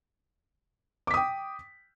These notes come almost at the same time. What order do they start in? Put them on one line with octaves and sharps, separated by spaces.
D6 B6 D#6 G5